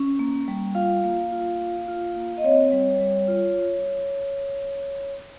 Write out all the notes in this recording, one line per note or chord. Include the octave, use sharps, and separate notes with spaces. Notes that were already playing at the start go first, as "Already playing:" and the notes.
Already playing: C#4
A#3
G3
F4 F5
A#3
F4
A#3
F4
A#3
D#5
C4 C#5
G3
G3
F4